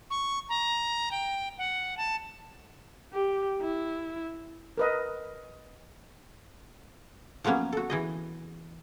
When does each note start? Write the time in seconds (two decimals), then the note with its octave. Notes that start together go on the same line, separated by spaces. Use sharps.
0.10 C#6
0.49 A#5
1.12 G5
1.58 F#5
1.97 A5
3.13 G4
3.61 E4
4.78 A#4 B4 D#5
7.44 F3 F#3 A#3 B3 C#4
7.73 F#4 A4
7.90 E3 G#4 D#5